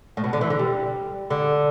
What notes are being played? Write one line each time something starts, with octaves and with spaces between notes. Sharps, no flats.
A2
B2
D3
E3
D3
G3
D3